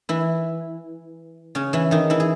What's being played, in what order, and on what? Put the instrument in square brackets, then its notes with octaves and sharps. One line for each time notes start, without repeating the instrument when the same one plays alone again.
[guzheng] E3 E4
C#3 C#4
E3 E4
D#3 D#4
E3 E4
G#4